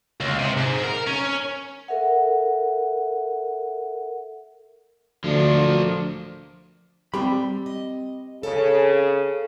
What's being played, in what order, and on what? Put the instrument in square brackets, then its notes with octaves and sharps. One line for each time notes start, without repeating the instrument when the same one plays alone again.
[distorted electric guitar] C#2
C3
G#2
A#4
C#4
[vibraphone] A4 A#4 E5 F#5
[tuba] D2 [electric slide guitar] F3 D4
[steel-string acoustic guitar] G3 [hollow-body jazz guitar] C4 G4 B5
[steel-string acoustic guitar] D#5
[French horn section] C#3 [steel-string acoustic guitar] A4